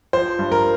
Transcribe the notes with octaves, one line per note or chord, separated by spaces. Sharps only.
F3 C5
G2
A#4